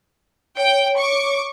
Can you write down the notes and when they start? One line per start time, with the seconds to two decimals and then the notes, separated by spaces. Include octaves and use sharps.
0.57 C#5 G5
0.97 C#6 D6